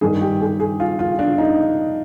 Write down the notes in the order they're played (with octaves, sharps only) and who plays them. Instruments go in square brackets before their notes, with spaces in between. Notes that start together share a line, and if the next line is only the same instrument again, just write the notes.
[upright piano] G2 D#3 G#4
G4
G#4
G#4
F4
F4
D4
D#4